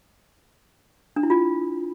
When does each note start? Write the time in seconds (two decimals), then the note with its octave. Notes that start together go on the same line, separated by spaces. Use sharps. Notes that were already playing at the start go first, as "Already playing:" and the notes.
1.16 D4
1.23 E4
1.30 F4